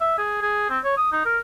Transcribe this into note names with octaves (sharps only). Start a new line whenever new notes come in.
E5
G#4
G#4
C4
C#5
D#6
D#4
A#4